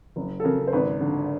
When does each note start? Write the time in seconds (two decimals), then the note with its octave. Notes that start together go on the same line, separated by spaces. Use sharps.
0.16 F#1
0.40 A4
0.44 C#3 A#4
0.67 C5
0.73 G#1 B4
1.01 D3